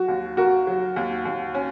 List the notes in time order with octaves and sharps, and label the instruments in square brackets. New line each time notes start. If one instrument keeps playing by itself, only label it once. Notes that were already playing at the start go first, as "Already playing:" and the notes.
Already playing: [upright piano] F#3 [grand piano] F#4
[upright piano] D#2
[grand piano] F#4 [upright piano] A#4
[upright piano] F#3
D#2
D#2
C#4